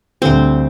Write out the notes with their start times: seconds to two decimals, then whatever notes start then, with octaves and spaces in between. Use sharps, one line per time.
0.22 D2 D3 G3 C4